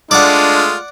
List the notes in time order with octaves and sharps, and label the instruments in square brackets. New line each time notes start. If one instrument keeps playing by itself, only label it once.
[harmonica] G#3 A3 F4 [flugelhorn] D4 [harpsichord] D5 F#5